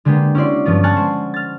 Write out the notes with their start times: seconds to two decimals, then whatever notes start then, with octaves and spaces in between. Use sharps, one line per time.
0.05 D3 G#3 A#3 B3 G4
0.35 C#4 E4 F#4 D5 C6
0.65 G2 F3 B3 F4
0.83 F#5 G#5 A5 C#6 F6 F#6
0.97 G#3 C5
1.34 F6 A6